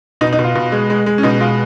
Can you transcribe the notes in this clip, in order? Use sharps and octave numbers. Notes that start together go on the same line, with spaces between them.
B2 D#4
D#4
B2
F4
B2
G#3
G#3
G#3
C#4
B2 D#4
G#3 F4